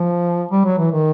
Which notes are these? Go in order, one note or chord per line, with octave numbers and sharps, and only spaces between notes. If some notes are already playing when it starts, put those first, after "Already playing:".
Already playing: F3
G3
F#3
E3
D#3